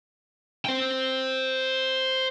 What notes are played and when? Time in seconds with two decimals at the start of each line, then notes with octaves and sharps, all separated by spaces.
0.65 C5 G5